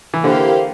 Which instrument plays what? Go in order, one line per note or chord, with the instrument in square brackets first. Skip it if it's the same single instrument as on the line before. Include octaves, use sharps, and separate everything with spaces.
[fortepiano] E3
[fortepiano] D3 [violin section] A#3 E4 G4 C5 F5